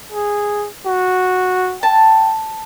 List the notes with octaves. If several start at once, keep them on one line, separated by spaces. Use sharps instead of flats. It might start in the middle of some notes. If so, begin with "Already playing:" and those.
G#4
F#4
G5 A5